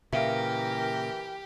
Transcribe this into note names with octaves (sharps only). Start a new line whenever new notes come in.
A#2 C#3 E3 G4 A#4 E5 F5